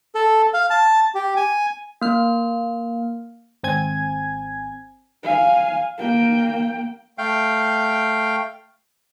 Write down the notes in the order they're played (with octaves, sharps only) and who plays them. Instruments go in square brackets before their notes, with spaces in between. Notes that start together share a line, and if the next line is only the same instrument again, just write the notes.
[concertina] A4
F5
A5
G4
G#5
[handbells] A#3 F6
[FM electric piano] G#1 C4 G#5 G#6
[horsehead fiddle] F5 G#5
A#3 G5
[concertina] A3 F5 G5